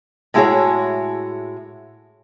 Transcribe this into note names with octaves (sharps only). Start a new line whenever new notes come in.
A2 G#3 E4 F#4 G#4 C#5